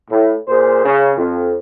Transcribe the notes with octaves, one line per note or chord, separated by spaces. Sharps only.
A2
A#2 G#4 C5
C#3
F2